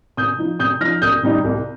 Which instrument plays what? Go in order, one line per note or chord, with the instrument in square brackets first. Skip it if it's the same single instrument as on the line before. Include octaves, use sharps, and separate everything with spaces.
[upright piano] C3 D#6 G6
F3 D#4
C3 D#6 G6
F3 D#4 F6 A#6
C2 D#6 G6
C3 G3 D#4
C2